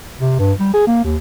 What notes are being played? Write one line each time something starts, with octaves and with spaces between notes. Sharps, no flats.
C3
G2
G3
G#4
A#3
D#2